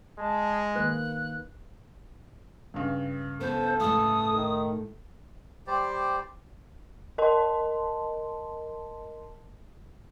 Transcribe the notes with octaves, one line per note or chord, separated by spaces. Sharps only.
G#3 A5
D#3 A#3 B4 F#6
G2 C#3
B3 A4 C5
A2 A3 D#6
D#3
G3 G4 C5 D5
A#4 D#5 A5 C6